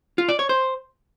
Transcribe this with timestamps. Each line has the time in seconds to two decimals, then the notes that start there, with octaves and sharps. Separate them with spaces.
0.18 F4
0.29 D5
0.39 C#5
0.49 C5